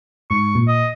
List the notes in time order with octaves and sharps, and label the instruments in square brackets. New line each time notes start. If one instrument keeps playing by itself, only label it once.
[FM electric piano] G#2 [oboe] C#6
[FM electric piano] A#2
[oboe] D#5